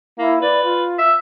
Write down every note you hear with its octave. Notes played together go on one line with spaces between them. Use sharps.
A#3 E4
B4 D5
F4
E5